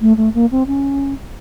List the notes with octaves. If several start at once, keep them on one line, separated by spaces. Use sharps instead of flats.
A3
A3
A#3
C4
C#4